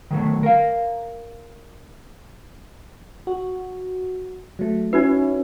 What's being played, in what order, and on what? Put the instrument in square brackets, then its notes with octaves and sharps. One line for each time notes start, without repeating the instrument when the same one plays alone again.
[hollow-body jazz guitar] D#3 F#3 A3
A#4 F5
[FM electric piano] F#4
F#3 A3
[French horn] C#4 [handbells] D#4 F#4 B4 [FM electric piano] E4